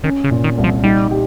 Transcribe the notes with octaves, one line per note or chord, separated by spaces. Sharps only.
D#3 C#4
C#3
A#2
D#3
C2
F3
G3 D#4
G4